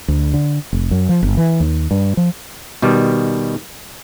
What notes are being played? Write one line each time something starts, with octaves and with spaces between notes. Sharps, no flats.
D2
D3
F1
F#2
F3
G1
E3
D#2
G2
F3
B2 D#3 G3